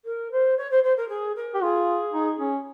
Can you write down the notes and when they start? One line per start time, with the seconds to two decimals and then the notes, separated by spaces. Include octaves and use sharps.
0.05 A#4
0.31 C5
0.57 C#5
0.71 C5
0.83 C5
0.96 A#4
1.09 G#4
1.36 A#4
1.54 G4
1.62 F4 G#4
2.13 D#4
2.39 C#4